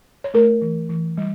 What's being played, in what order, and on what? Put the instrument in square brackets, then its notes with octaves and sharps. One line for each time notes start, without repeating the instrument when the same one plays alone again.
[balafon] C#5
A3 A#4
E3
E3
G3